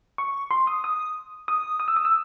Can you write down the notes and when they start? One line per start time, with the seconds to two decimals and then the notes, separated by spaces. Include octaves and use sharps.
0.18 C#6
0.51 C6
0.67 D#6
0.84 D#6
1.48 D#6
1.80 D#6
1.88 E6
1.96 D#6
2.05 E6